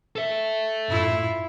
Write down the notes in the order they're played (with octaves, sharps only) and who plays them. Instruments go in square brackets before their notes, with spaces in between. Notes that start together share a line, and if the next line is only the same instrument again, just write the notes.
[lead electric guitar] A4 E5
[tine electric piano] F#2 A2 [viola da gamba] E4 F4